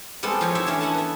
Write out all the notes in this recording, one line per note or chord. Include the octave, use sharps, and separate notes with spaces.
G3 G#3 B3 C4 A4
F3 C4 F4 G4 C#5
D#4 E4 G4 C#5 E5
D3 E3 A3 C#4
A4 F#5 G#5 A5
B3 E5